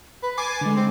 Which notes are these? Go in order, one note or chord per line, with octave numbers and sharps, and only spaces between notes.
B4
G#5 D6 A6 C7
D3 G#3
C4